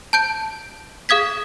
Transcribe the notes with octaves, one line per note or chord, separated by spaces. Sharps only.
A5 G6 D7
G#4 F5 D#6 G#6 B6